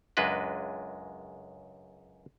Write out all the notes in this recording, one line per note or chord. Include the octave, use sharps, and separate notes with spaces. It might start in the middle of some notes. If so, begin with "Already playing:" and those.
C#2 F#2 G#3 D4 B4 D#5